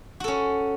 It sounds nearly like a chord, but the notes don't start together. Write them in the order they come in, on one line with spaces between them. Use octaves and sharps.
F#4 A4 C#4